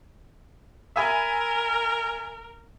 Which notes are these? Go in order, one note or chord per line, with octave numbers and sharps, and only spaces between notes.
A#4 E5 G#5 B5